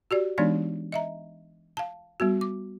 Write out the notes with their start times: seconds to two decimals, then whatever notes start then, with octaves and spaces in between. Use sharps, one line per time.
0.11 F#4 G4 D5
0.38 E3 G#3 B3 D4 D#4 D5
0.92 D#5 E5 A#5
1.77 F5 A5
2.20 G3 B3 F#4
2.41 D6